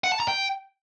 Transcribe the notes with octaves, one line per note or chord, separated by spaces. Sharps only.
F#5
A5
A#5
G5